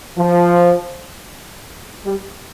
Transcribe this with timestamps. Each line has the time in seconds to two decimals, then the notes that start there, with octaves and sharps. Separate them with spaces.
0.18 F3
2.05 G3